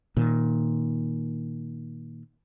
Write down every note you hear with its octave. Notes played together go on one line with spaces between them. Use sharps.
A#2 D#3